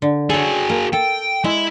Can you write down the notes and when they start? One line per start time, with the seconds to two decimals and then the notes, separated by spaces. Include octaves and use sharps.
0.02 D3
0.30 F#4 G#4 A4 C#5
0.69 A#3
0.93 A4 G5
1.44 G#3 E4